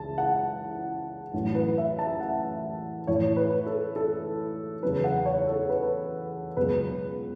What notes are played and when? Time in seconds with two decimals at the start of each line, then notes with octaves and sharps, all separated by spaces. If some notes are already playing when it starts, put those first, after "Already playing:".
Already playing: C#2 C#3 E3 A5
0.18 F#5
1.34 A1 A2 F#3
1.55 B4
1.78 E5
1.99 A5
2.20 F#5
3.07 A1 A2 E3 C#5
3.37 B4
3.66 A4
3.96 A4
4.82 E2 C#3 F#3 B4
5.04 F#5
5.26 C#5
5.47 A4
5.70 B4
6.57 C#2 B2 F#3 B4